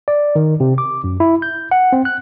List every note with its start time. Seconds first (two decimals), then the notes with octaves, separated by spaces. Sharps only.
0.08 D5
0.36 D#3
0.60 C3
0.78 D6
1.04 F#2
1.20 E4
1.42 G6
1.71 F#5
1.93 C4
2.05 F#6